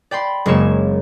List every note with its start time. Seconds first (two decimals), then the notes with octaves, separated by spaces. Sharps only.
0.11 D5 G5 B5 C6
0.46 F#1 G#3 A#3 C#5 E7